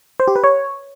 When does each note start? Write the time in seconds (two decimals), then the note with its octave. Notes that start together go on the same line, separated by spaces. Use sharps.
0.20 C5
0.28 G4
0.36 B4
0.44 C#5